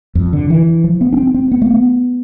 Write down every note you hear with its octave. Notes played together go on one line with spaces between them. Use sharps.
F2
D3
E3
F3
B3
D4
C4
C4
B3
A3
B3